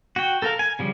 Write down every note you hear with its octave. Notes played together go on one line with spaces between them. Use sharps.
F#4 G5
A4 A#4 F5
G#5
C#3 F3 G3